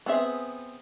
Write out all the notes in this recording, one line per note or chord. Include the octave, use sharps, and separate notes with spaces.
B3 C4 G#4 E5